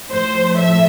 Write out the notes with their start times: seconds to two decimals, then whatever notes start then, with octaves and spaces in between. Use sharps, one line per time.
0.11 A2 F3 A3 C5
0.58 E5